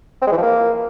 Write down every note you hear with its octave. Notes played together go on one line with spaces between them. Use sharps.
C4
G#3
E3
F3
A#3